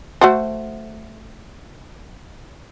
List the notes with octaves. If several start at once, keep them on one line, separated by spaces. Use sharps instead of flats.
A3 F#4 C5